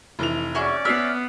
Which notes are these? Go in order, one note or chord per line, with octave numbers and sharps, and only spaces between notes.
F1 E3 F7
C#4 F#4 G#4 D5 E5
B3 E5 F6 C7